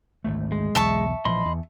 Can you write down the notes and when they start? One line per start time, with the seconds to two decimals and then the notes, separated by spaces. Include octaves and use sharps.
0.24 G#1 D2 A3
0.52 G#3
0.75 B1 E2 E5 A5 C#6
1.25 A#1 E3 F3 D#5 B5 C6
1.45 E2